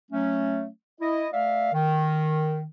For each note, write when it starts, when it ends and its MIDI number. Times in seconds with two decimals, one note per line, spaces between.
0.11 0.67 54
0.11 0.67 57
0.11 0.67 61
1.01 1.27 64
1.01 1.27 75
1.33 1.71 57
1.33 1.71 74
1.33 1.71 76
1.33 1.71 77
1.73 2.65 51